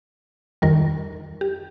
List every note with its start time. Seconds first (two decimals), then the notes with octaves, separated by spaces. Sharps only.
0.62 F2 D#3 G3 A#4
1.41 G4